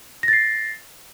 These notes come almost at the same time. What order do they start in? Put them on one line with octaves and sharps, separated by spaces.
A#6 A6 C7